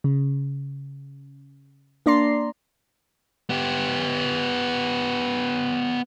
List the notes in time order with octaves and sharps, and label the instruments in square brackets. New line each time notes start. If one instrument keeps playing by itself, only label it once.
[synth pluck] C#3
A#3 D4 D5 A#5 C6 C7
[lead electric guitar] B3 G4